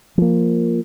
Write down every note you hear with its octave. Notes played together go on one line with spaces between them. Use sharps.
F3 A#3